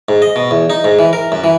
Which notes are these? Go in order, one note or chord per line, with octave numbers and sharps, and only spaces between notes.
G#2
D#5
B2
E2
D#4
G#2
E3
A#4
F#2
E3